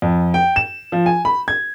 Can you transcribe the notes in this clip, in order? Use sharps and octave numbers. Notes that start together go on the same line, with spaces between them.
F2
G5
E7
F3
G#5
B5
G#6